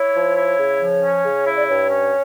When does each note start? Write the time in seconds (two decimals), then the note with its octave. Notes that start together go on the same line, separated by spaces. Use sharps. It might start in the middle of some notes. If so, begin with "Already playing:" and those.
Already playing: E4 C#5
0.14 F3
0.36 E4
0.58 C#3
0.80 F3
1.02 C#4
1.24 C#3
1.45 E4
1.56 D5
1.67 G2 C#5
1.89 C#4